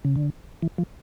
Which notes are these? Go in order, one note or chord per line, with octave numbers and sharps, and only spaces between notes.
C#3
D3
E3
F3